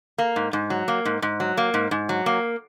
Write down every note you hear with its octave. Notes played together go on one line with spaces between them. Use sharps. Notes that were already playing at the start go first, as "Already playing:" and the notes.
A#3
G#2
G#2
F#3
A#3
G#2
G#2
F#3
A#3
G#2
G#2
F#3
A#3